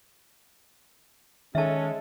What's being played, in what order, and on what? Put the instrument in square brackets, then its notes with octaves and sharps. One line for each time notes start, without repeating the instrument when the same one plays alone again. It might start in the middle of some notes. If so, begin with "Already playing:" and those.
[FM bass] D#3 [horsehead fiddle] G#3 A4 [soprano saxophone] C#4 [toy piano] E5 A5